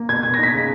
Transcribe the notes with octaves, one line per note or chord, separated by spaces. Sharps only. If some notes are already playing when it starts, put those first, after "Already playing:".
Already playing: A#3
B2 G#6
B2 G#6
A#6
D#4 B6
C#3